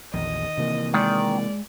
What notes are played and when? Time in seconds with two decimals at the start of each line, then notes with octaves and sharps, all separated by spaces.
0.14 A#1 E2 D#3 D#5
0.58 C3 E3 A#3
0.94 D#3 G#3 D5 F#5